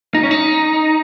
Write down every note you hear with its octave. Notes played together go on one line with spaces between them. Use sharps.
D#4
C#4
D#4